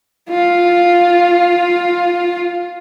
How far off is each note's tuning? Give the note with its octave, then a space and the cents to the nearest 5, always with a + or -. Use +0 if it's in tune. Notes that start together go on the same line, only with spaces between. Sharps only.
F4 +5